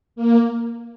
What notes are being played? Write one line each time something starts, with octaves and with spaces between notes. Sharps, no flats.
A#3